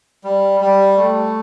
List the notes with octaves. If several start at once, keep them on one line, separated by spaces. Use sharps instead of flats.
G3
G3
A3